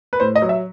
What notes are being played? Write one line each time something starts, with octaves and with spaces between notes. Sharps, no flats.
B4
A2 C5
D#5
F#3
E5